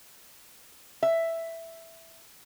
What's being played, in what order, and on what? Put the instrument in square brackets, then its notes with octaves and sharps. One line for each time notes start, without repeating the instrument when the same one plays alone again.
[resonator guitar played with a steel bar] E5